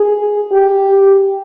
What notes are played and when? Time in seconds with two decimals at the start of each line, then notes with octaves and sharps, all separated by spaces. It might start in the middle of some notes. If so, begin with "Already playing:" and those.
Already playing: G#4
0.52 G4